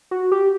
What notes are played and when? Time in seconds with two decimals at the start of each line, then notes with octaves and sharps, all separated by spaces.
0.11 F#4
0.32 G4